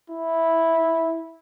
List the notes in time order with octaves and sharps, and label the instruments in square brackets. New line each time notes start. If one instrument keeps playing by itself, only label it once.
[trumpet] E4